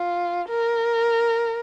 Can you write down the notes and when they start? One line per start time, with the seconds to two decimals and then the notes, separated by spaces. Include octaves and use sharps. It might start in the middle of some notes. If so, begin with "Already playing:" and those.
Already playing: F4
0.49 A#4